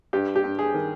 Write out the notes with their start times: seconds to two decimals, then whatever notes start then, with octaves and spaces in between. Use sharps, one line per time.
0.13 G2 G4
0.36 G4
0.44 G2
0.59 G#4
0.74 D#3